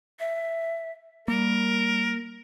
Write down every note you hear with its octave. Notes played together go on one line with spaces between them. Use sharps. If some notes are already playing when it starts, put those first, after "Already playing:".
E5
G3 A#3 A#4